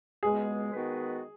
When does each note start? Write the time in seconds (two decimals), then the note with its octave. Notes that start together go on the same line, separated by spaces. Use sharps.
0.22 C#2 B2 G#3 B3 G#4
0.72 D#3 G#3 B3 F#4 B4